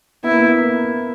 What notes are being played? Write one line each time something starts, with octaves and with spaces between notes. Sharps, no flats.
B3 E4
A#3
B3